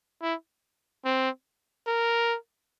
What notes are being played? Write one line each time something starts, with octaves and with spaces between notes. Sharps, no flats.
E4
C4
A#4